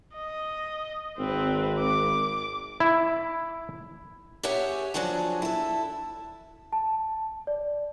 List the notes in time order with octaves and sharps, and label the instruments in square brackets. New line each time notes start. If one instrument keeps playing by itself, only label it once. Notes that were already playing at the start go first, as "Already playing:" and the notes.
[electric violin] D#5
[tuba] G#1 [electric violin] C4 B4
[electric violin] D6
[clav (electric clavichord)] E4
[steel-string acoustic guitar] G4 G#4 C#5 E5 F#5 G#5
F3 F#3 D4 F#4 G#4
E4 A4
[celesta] A5
D5